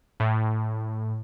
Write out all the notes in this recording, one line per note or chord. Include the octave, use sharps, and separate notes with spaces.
A2